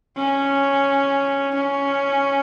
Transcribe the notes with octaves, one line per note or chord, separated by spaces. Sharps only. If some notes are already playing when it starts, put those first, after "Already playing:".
C#4
C#4